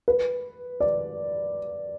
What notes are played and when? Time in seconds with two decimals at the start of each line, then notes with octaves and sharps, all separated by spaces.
0.08 B4
0.80 D5